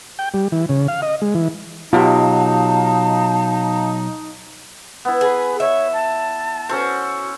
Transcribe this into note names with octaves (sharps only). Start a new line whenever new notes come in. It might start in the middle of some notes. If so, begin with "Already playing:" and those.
G5
G3
E3
C#3
F5
D#5
G#3
E3
B2 F#3 D#4 F4 G4 F5 A5
B3 E4
G#4 B4
C#5 E5
A5
C#4 F#4 A4 C5